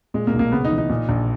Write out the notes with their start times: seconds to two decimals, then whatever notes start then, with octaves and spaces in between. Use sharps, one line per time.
0.14 A#2 G#3
0.27 A#3
0.34 B1
0.39 A#3
0.52 C#3 B3
0.65 D#4
0.71 E3
0.78 D#4
0.89 A#2
1.09 A#1